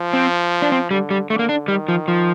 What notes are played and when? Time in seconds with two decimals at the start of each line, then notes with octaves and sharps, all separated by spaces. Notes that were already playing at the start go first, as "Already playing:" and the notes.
Already playing: F3
0.13 C4
0.62 D4
0.72 C4
0.91 D3 G3
1.11 G3
1.30 D3 A3
1.39 A#3
1.49 D4
1.68 D#3 G3
1.88 F3
2.08 F3